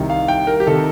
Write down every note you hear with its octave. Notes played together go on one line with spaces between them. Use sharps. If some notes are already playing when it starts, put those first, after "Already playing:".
Already playing: C2 C3 D#3
F5
G5
A#4
G4
C3 D#3 A4